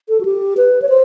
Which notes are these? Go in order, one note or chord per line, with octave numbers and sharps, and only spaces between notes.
A4
F#4
G4
B4
C#5
C5